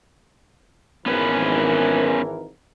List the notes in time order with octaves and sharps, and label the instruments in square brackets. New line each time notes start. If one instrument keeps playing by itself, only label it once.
[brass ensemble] G#1 E3 A#4 [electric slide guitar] B3 C#4 B4